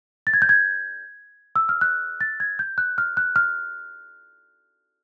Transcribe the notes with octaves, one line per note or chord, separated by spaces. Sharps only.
A6
G#6
G6
G#6
E6
F6
F#6
A6
G#6
G6
F#6
F6
F#6
F6